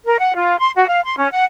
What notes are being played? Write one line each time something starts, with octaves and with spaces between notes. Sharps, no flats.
A#4
F#5
F4
C6
F#4
F5
C6
C#4
F#5